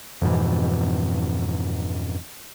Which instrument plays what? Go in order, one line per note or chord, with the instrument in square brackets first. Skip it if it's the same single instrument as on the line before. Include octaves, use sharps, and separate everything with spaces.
[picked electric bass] F2 G#2 B2 E3